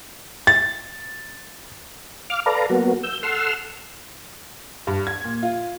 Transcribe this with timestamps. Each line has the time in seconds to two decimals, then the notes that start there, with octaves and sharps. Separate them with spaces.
0.47 A6
2.30 F5 D6 F6
2.46 A4 B4 D5 F5 A#5
2.70 F#3 A#3 B3 F#4
3.03 E6 G6
3.23 A4 F#5 C6 E6 F6
4.87 G2
5.07 G#6
5.24 A#2
5.43 F4